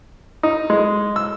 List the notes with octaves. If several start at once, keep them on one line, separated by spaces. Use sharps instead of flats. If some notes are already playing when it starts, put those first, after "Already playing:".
D#4
G#3
E6